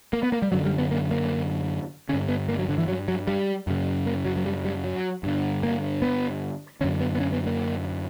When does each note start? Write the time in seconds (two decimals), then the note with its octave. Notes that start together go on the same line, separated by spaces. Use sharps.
0.13 A#3
0.23 B3
0.32 A#3
0.42 G3
0.52 F#2 D3 F#3
0.65 G3
0.78 B3
0.91 A#3
1.11 A#3
2.09 D3 C#4
2.13 G2
2.28 B3
2.49 A#3
2.59 F#3
2.69 D3
2.78 E3
2.88 F#3
3.08 F#3
3.27 G3
3.67 F#2 C#3
4.06 A#3
4.25 F#3
4.36 F#3
4.46 G3
4.65 G3
4.84 F#3
5.23 G2 D3
5.63 A#3
6.02 B3
6.81 D3 C#4
6.84 F#2
7.00 B3
7.15 B3
7.20 C#4
7.32 B3
7.46 A#3